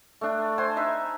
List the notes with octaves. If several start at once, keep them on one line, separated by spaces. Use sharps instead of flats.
A3 D4
C5 G#5 A5
D#4 B4 E5